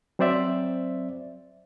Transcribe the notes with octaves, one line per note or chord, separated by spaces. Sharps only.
F#3 C4 C5 D5 E5